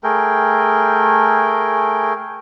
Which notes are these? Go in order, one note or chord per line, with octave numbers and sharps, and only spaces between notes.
A3 G#4 A#4 G5